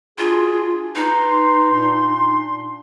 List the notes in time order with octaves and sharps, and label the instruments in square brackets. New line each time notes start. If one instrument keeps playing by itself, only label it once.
[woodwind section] D4 F#4 G#4 [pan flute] F4
[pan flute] D#4 [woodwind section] B4 A#5 C6
[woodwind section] A#2 D4 C6